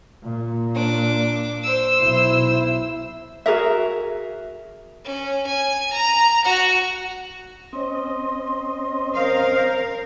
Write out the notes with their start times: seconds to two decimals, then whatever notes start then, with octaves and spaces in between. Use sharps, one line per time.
0.23 A#2
0.74 D4 D6
1.63 C5 E6
2.01 B1 E4
3.46 F#4 G#4 A#4 E5
5.05 C#4
5.47 G#5
5.92 A#5
6.45 F#4 F#5
7.73 C4 C#4 D#5 C6
9.15 A#4 C5 F5